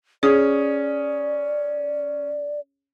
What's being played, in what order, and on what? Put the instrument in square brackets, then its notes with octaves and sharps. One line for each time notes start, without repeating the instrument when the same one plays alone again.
[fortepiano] C#4 D#6 [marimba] G#4 [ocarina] D5